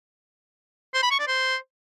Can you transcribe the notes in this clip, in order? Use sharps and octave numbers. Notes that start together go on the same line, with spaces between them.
C5
B5
C#6
D5
C5